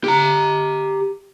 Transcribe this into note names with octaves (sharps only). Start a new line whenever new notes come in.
G4 A#5